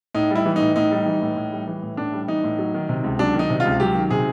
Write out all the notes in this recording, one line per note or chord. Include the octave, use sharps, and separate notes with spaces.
A2 D#4
G3 E4
E3
A2 D#4
A2 D#4
G3
E3
A2
A2
G3
E3
A2
A2 D4
G3
E3 D#4
A2
F#3
D#3
C3
C#2
F#3 D4
D#3
D#4
C3
F4
C#2
F#3 G4
D#3
C3 G#4